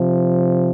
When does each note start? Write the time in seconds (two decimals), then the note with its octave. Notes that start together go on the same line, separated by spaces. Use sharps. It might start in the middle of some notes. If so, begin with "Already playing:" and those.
Already playing: C3 F3